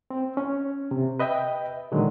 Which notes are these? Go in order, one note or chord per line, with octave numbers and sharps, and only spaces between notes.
C4
C#4
C3
B4 D#5 E5 G5
A#2 D3 D#3 F#3 G#3